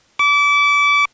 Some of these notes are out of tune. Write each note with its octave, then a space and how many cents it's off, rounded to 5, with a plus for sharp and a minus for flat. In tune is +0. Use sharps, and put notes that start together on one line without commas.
D6 -30